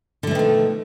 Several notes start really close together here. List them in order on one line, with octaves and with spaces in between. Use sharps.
D3 A3 B2 D#3 F3